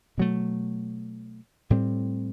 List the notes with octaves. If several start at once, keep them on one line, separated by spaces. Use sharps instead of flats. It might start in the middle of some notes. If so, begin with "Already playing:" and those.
B2 F#3 A3
A2 G3 C4